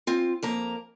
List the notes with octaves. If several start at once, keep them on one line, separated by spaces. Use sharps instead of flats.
C4 F4
F2 A#3 A#5